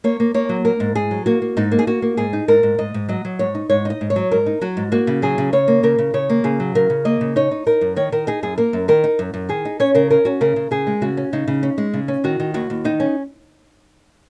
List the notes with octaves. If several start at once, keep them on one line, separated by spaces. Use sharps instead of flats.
A#3 C#5
A#3
A#3 C#5
F#3
A#3 A#4
G#2
G#2 G#4
F#3
A#3 F#4
A#3
G#2 D#4
A#3
G#4
A#3 F#4
A#3
G#2 G#4
D#4
G#2 A#4
G#2
G#2 D#5
G#2
F#3 D#5
F#3
G#2 C#5
D#4
G#2 C#5
D#4 D#5
G#2
C#5
F#3
G#2 A#4
D#4
F#3 F#4
G#2
A#3 F#4
C#3
F#3 G#4
C#3
C#3 C#5
A#3
C#3 A#4
C#3
C#3 C#5
A#3
C#3 G#4
F#3
C#3 A#4
C#3
A#3 D#5
C#3
D#4 C#5
D#4
D#4 A#4
F#2
D#3 C#5
D#3 A#4
D#4 G#4
F#2 G#4
A#3 A#4
F#2
D#3 A#4
D#4
F#2
F#2
D#3 G#4
D#4
C#4 C#5
C#3 A#4
C#4 A#4
C#4 F#4
C#3 A#4
C#3
C#3 G#4
G#3
C#3 F#4
C#4
C#3 D#4
C#3
C#4
G#3
C#3
C#4
D#3 F#4
D#3
D#2 F#4
D#2
D#3 D#4
C#4